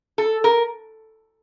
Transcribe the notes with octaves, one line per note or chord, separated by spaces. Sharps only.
A4
A#4